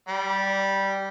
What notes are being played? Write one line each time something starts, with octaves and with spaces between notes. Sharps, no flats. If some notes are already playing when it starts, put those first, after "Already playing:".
G3